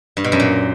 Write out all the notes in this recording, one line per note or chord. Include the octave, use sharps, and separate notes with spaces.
G2
B2
F#2
A#2